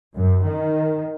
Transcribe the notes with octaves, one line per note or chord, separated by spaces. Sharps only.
F#2
D#3